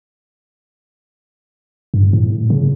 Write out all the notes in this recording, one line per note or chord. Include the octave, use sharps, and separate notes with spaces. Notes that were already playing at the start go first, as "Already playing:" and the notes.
G2
A2
C#3